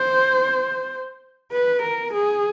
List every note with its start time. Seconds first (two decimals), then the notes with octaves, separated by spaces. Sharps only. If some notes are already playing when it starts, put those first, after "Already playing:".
Already playing: C5
1.52 B4
1.83 A#4
2.13 G#4